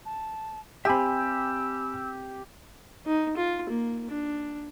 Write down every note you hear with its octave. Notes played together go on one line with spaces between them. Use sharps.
A5
C4 G4 E5 G5 G#5 B5 E6
D#4
F4
A#3
D4